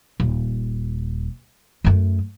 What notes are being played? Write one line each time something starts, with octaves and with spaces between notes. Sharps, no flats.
D#1
F#2 A3